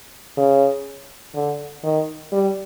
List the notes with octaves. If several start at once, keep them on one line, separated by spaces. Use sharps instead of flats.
C#3
D3
D#3
G3